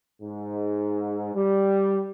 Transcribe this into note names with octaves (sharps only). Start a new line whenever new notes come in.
G#2
G3